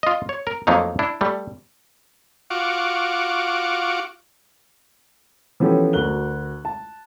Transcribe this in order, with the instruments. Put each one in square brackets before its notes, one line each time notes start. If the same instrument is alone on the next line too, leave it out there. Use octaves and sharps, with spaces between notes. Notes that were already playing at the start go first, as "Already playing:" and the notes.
[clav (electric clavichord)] F4 D#5
C#5
A#4
F2 F#3 A3 A#3 D#4
D4 E4
G3 A3
[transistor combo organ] F4 F#4 C#6 D6
[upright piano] E3 F3 B3 C#4 G4 A4
D2 F#4 A#4 F#6 G7
A5